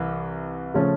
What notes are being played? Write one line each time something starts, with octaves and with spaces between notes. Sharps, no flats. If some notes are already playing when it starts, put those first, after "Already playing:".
Already playing: C2 E3
C#3 F3 A3 C#4